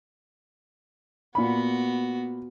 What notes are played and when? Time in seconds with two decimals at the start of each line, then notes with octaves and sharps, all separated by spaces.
1.35 A#2 B3 F#4 B5